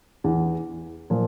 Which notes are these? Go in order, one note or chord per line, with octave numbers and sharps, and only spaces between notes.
E2 E3
A#2 F3